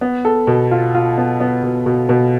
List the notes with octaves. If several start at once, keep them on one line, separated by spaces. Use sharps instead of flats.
B3
A4
B2
F4
F4
B3
B3
B2
B2
B2